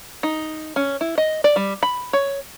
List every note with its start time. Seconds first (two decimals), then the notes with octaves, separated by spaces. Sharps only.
0.23 D#4
0.76 C#4
1.01 E4
1.18 D#5
1.44 D5
1.56 G3
1.83 B5
2.13 C#5